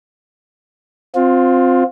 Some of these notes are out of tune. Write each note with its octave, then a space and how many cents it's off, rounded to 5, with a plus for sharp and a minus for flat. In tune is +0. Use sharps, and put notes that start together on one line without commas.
C4 +0 F4 +20